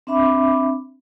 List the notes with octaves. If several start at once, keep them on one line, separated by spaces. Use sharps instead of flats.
C4 D4 E5 B5 D6